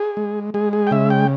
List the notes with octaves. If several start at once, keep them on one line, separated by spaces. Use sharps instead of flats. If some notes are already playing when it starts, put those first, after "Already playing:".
Already playing: G#4
G#3
G#3 G#4
G#4
G5
C#3 E5
G5